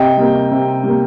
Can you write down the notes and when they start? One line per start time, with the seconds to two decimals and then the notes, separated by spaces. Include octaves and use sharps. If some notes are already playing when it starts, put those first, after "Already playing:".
Already playing: C3 D#5 G5
0.17 G3 A#3
0.51 C3
0.83 G3 A#3